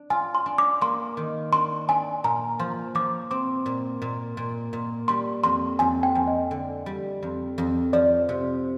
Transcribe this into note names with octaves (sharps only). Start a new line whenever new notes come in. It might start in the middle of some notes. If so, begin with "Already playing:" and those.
Already playing: D4
F4 G#5
C6
D4
D6
A#3 C6
D#3
D4 C6
D4 G#5
A#2 A#5
F3 C6
F3 D6
C4 D6
A#2
A#2
A#2
A#2
G3 C6
F2 C6
F2 G#5
G5
F2
D#5
D3
G3
F2
F2
F3 D5
C3